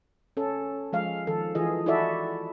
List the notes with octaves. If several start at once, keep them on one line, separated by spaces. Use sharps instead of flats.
C#4 A4
F3 G#3 F5
D#3 F3 A4
E3 F4 G#4 D#5
E4 F#4 A4 D5 E5